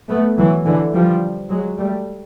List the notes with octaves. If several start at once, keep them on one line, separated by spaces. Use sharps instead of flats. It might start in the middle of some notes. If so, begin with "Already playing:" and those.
A3 B3
E3 F#3
D3 E3
F3 G3
F#3 G#3
G3 A3